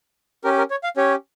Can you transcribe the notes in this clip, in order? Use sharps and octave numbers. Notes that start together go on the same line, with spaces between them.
C#4 G4 A#4
A#4
C#5
F5
C#4 G4 C#5